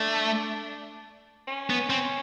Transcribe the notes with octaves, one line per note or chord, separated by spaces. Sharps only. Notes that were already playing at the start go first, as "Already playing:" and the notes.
Already playing: A3 D4
C#4
B3
C4